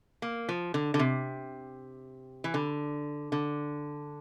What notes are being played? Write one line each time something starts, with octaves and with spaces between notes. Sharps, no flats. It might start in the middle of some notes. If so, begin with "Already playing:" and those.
A#3
F3
D3
D3
C3
E3
D3
D3